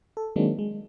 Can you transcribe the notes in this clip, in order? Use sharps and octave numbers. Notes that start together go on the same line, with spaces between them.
A4
D#3 F#3 G#3 A#3 C4 D4
G#3